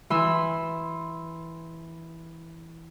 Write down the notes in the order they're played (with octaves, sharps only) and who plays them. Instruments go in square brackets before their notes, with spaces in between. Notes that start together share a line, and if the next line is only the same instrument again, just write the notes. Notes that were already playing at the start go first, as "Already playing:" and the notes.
[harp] E3 C6 E6